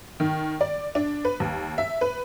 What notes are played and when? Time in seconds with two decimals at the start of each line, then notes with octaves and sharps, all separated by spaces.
0.20 D#3
0.61 D5
0.95 D4
1.25 B4
1.40 D#2
1.78 E5
2.01 B4